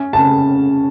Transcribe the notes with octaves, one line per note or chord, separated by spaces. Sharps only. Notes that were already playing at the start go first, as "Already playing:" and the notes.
Already playing: C#4
C#3 A5